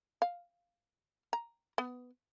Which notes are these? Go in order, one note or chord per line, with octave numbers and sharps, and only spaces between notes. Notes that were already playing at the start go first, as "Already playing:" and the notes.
F5
A#5
B3